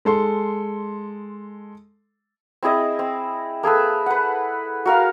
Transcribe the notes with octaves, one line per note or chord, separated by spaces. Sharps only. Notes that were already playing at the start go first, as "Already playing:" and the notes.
G#3 A4 C6
C4 E4 G#4 D#5
C4
A#3 G#4 A4 B4
B4 F#5
F#4 A#4 F5